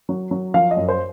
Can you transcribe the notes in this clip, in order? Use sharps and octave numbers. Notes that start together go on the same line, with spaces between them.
F#3
F#3
F3 F5
D#5
F#2
C5